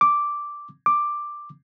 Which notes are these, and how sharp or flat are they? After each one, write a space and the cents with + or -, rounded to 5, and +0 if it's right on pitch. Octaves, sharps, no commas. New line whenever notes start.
D6 -5
D6 +5